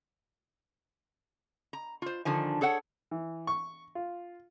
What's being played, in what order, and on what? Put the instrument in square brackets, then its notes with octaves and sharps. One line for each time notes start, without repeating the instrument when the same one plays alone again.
[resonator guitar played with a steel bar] A#5
F4 C5
D3 D#3 F3 G#5
G#4 A4 C#5 F#5 G5
[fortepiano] E3
C#6
F4